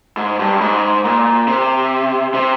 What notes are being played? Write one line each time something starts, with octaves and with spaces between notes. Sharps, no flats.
G#2
G2
G#2
A#2
C3
C3